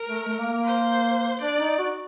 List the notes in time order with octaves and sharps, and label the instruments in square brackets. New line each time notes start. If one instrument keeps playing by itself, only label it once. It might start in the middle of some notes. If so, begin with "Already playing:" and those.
Already playing: [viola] A#4
[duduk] A3
A3
A#3
A#3
[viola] C5
[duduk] D4 [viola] D5
[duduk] D#4
F#4